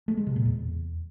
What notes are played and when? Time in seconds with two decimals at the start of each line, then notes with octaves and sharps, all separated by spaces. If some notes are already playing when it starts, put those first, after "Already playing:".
0.08 A3
0.17 G#3
0.27 C3
0.36 A#2
0.45 E2